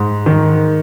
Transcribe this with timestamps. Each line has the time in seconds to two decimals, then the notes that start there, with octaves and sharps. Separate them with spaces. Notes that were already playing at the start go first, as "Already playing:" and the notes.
Already playing: G#2
0.26 D#3